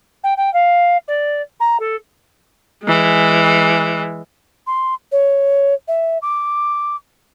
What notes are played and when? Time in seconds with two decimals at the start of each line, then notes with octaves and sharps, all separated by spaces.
0.23 G5
0.37 G5
0.53 F5
1.08 D5
1.60 A#5
1.79 A4
2.84 E3 G#3
4.67 C6
5.12 C#5
5.88 E5
6.22 D6